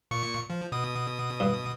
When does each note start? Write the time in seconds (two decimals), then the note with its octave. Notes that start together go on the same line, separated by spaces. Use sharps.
0.11 A#2 C#6 C#7
0.50 F3
0.72 B2 D#6
1.40 G2